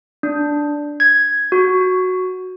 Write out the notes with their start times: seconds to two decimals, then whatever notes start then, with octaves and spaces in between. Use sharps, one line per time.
0.23 D4
1.00 G#6
1.52 F#4